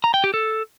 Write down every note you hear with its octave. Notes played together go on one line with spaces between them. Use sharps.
A#5
G5
G4
A4